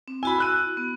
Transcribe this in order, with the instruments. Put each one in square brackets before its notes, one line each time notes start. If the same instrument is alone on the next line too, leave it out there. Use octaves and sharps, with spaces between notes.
[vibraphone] C4
[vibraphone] E4 F#4 [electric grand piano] G#5 B5
[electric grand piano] E6 F#6 D#7
[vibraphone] B3